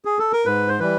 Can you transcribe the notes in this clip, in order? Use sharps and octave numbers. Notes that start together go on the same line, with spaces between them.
G#4
A4
A#4
G#2 B4
C5
E3 G3 B4